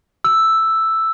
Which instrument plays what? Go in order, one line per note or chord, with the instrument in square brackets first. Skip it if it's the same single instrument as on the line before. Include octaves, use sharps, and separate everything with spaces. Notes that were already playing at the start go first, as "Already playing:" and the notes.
[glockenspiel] E6